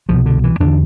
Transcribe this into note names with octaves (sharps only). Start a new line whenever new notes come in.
C2 B2 F3
D3
E3
E2 D3 D4